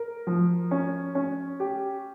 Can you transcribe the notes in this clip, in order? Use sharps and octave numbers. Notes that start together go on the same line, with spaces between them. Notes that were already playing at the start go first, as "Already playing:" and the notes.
Already playing: A#4
F3
C#4
C#4
G4